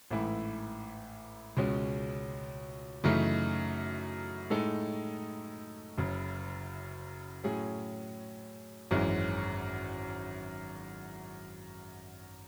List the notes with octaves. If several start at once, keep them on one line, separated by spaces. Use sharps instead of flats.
A1 G#2 E3 A3 E4
C#2 B2 G#3 C#4
F#2 C#3 E3 A3 D#4
A2 G#3 D#4 A4
F#1 F#2 C#3
A2 F#3 C#4 G#4
G#1 F#2 E3 G#3 C#4